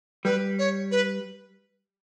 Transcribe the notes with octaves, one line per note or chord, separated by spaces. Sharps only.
G3 B4
C#5
B4